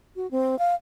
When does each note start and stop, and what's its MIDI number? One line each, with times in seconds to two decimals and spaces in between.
0.16 0.29 66
0.31 0.58 60
0.59 0.75 77